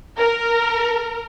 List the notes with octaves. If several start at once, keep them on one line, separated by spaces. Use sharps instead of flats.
A#4